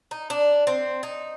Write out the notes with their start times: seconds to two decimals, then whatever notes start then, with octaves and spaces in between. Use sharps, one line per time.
0.11 D#4
0.30 D4
0.67 C4
1.03 D#4